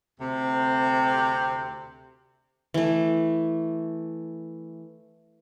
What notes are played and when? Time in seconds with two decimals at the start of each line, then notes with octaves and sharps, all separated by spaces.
0.20 D2 C3
2.74 E3 A3